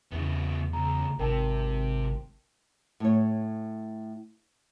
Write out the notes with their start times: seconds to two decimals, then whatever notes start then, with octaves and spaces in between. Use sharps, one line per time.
0.12 E2 C#3 B3
0.73 C#2 A#5
1.19 G#1 C3 A#4 G5 A5
3.00 A2 C#5